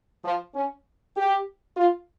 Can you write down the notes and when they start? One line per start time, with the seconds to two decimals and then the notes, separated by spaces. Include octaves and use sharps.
0.24 F3
0.55 C#4
1.16 G4
1.77 F4